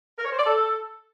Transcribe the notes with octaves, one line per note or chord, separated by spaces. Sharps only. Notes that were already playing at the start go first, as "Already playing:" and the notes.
A#4
C#5
C5
D5
A4